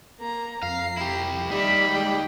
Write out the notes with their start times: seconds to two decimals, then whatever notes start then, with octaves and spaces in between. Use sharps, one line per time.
0.20 A#3 A#5
0.63 F2 F5 A#5 C7
0.97 E4 G4
1.51 G3 D#4 G4 E5 B5
1.89 G#3 G5